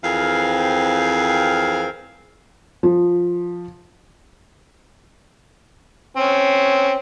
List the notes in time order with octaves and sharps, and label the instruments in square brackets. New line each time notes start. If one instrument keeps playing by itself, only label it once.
[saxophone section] F2 E3 C4 G#4 A#4 F5
[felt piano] F3
[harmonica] C4 C#4